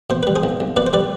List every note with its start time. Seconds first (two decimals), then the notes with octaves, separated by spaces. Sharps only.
0.10 B2 C5
0.23 G3 B4
0.36 G#4 C5
0.43 B1
0.60 B1
0.76 B2 B4 D5
0.87 C5
0.93 G3 B4 D5